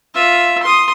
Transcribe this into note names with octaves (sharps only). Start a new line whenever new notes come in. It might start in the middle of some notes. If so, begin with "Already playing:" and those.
F4 E5
C6 D#6